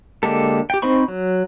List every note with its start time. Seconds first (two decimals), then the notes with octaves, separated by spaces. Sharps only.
0.23 D3 G#3 A#3 G4 A4
0.70 G4 G5
0.82 C4 D#4 C5 B5 C#6
1.08 F#3